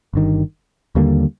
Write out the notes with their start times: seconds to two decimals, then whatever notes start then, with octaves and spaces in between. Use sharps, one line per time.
0.13 G1 G2 D#3
0.95 D#2 D3 G3 A#3